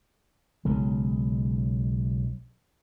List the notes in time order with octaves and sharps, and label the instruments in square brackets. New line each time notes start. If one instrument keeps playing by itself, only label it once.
[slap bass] B1 C#3 G#3